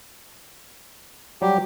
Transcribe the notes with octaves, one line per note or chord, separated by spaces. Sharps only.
F#3 G3 G4